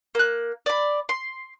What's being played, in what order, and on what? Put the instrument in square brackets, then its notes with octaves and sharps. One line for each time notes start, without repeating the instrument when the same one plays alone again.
[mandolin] A#3 F#6
D5 B5
C6